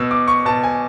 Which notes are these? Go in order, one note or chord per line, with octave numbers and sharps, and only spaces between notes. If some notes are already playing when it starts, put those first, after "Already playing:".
Already playing: B2 E6
D6
C#6
B2 A5
G#5